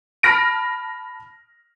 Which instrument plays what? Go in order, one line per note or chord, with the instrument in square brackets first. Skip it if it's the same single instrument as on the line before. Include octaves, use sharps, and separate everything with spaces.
[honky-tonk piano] A5 B5 F6 A#6 D7